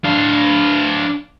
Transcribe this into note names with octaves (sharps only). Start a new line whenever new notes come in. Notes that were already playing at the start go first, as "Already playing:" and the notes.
D4 F5